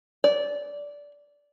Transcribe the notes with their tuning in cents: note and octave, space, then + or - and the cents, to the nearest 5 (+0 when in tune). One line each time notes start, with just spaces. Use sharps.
D5 -15